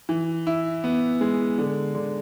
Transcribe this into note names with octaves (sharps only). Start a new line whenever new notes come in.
E3
E4
B3
G#3
D3
D3